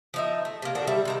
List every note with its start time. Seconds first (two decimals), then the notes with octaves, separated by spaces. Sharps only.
0.14 F3 D#4 E5
0.45 A3
0.62 C3 A#3
0.75 D3 D#3 D4 F#4
0.87 G3 E5
1.05 C3 D#3 A#5